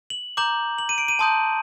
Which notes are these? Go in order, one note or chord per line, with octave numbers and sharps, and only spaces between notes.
F#7
A#5 D6 G6 F#7
F#7
D#7
D7
D#7
A5 C6 D#6 G6